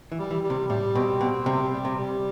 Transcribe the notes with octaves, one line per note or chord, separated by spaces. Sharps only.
E3
G3
E3
G3
C3
A2 G3
B2 C4
B2 C4
C3 G3
G3
C3
G3